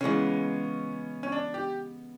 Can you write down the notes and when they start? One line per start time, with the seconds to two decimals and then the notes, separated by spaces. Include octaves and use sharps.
0.01 C#3 E3 G#3 B3 C#4
1.23 C#4
1.32 D4
1.54 G4